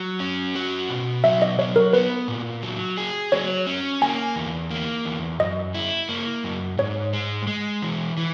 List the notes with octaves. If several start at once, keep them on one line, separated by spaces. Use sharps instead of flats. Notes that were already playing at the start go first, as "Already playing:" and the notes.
Already playing: F#3
C#4
F#4
B2
F#3 E5
D#5
F#3 C#5
A#4
B3 B4
A#2
F#3
G#4
F#3 C#5
C#4
A#3 G#5
E2
A#3
E2
F#2 D#5
E4
A#3
F#2
G#2 C#5
G#3
G#3
E3
E3